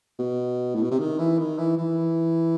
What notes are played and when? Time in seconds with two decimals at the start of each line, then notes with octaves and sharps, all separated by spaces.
0.19 B2
0.75 A2
0.83 B2
0.91 C3
0.99 D#3
1.19 E3
1.38 D#3
1.58 E3
1.77 E3